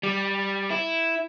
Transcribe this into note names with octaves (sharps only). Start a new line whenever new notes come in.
G3
E4